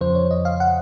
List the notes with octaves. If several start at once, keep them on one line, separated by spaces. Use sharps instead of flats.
F2 C#3 F3 C5
C#5
D#5
F5
F#5